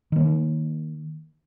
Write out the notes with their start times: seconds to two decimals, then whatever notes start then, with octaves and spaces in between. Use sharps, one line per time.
0.12 D#3 A#3